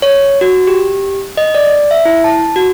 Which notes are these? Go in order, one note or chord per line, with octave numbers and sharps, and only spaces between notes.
C#5
F#4
G4
D#5
D5
E5
E4
A5
F#4